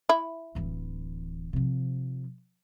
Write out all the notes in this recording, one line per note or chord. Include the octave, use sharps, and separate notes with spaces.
E4
D1 E3
C3 F3